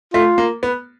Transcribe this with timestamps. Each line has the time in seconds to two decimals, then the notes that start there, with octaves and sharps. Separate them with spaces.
0.14 A3 F4
0.38 A#3
0.63 B3